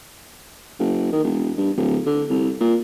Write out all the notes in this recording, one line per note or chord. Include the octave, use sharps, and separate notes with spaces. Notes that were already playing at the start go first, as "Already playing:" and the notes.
F#1
D#3
E1
G2
D1
D3
C2
A#2